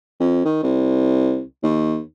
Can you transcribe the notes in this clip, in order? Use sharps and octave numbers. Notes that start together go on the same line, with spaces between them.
F2
D#3
C2
D#2